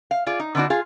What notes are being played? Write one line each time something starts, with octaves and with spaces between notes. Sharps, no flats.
F5
F4 G#4 D5
D#4
D3 B3 D4 D#4 F#4
F4 G#4 F5